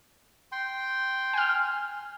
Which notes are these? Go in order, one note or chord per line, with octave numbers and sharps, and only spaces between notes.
G5 C6
G#5 F6